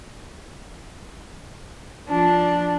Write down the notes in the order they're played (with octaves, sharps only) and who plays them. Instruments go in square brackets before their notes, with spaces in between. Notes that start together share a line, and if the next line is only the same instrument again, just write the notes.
[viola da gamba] F3 [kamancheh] D4